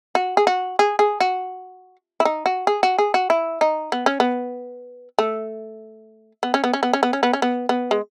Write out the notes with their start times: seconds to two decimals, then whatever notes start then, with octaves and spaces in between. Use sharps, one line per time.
0.15 F#4
0.37 G#4
0.47 F#4
0.79 G#4
0.99 G#4
1.20 F#4
2.20 E4
2.25 D#4
2.46 F#4
2.67 G#4
2.83 F#4
2.98 G#4
3.14 F#4
3.30 E4
3.61 D#4
3.92 B3
4.06 C#4
4.20 B3
5.19 A3
6.43 B3
6.54 C#4
6.64 B3
6.73 C#4
6.83 B3
6.93 C#4
7.03 B3
7.13 C#4
7.23 B3
7.33 C#4
7.42 B3
7.69 B3
7.91 G#3